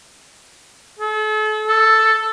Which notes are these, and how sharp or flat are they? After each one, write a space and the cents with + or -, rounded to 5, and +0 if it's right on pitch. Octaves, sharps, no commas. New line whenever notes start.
A4 -40
A4 +5